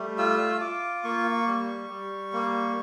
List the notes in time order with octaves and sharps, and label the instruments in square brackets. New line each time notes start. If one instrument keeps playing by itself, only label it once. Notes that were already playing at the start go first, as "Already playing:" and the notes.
Already playing: [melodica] G3 A3
F4 E6
F4 D6
A#3 C#6
G3
G3
A#3